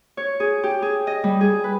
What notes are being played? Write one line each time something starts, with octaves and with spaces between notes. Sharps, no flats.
C#5
G#4
G4
G#4
D#5
G3
G#4
B4